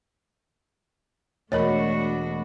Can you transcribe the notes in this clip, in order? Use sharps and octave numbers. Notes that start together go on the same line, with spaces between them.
E1 A3 D4 F#4 A#4 C#5 D#5 B5